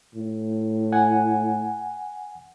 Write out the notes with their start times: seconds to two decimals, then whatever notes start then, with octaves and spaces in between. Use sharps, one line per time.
0.15 A2
0.92 F#5 G#5